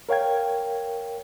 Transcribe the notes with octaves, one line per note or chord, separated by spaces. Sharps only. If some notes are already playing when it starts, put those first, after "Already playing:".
A#4 C#5 F5 G5 G#6